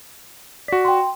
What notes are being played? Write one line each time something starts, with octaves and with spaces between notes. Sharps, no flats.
F#4 D5 B6
G5 C6